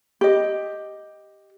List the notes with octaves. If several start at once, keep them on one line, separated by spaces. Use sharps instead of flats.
G4 D#5